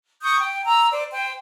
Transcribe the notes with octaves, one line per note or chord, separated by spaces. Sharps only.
C#6 D#6 G6
G5
A#5 E6
C5 D5
C5 G5